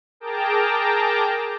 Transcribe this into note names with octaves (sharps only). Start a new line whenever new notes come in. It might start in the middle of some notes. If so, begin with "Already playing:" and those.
G#4 A#4 G5 A5 A#5 D6